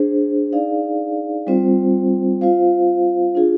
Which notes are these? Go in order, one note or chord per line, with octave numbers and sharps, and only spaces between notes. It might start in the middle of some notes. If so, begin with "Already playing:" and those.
Already playing: D4 G#4 C5
D#4 G#4 D5 F5
G3 C4 F4 C5
F4 C5 F5
D4 F4 G#4